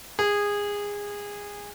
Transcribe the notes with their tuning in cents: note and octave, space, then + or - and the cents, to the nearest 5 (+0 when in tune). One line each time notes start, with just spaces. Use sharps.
G#4 -20